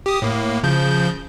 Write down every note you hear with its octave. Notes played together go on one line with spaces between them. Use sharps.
G4 D#6
A2 A#3
C#3 F3 G6